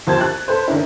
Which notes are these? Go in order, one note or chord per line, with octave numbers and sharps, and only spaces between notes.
D#2 F3 C5 A5 G#6
F#6 A6
A4 B4 C5
D#3 A#3 C#4 D4 E4